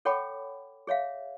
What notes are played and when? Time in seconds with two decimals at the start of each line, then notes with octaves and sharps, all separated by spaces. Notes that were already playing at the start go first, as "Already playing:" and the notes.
0.05 A4 C#5 F#5 G5 B5 D6
0.87 G#4 C#5 E5 F5